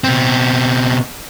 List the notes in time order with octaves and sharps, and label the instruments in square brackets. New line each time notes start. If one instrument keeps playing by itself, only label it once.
[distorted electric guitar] B2 C4